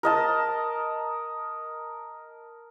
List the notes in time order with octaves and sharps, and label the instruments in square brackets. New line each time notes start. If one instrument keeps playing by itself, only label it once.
[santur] A#4 D#5 A5